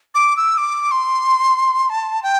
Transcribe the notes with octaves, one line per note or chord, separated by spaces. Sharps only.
D6
E6
D6
C6
A5
G5